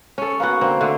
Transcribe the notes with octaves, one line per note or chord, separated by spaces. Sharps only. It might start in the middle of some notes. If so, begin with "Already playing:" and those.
C#4 A4
A#3 B3 C#4 F#4
D3 A#3 C4
D3 A3